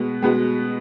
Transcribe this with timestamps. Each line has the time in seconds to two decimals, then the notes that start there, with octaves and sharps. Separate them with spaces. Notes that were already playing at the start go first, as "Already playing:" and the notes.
Already playing: B2 G#3 B3
0.22 B2 G#3 B3